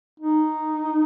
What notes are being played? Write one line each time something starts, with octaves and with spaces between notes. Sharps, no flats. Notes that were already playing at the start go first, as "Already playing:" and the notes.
D#4